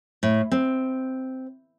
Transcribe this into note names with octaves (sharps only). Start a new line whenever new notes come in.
A2
C4